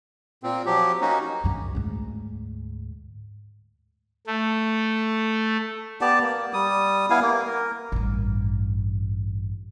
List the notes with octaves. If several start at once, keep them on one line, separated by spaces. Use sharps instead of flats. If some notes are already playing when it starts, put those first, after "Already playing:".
A#2 C4
F3 F#3 G4
A#3 C#4 D#4 F#4
F#2 C#3
D2 G#2
A3
B3 G4 D5 A5
A#3
G3 D#6
B3 E4 F5 G#5
A#3
A#4
A1 G2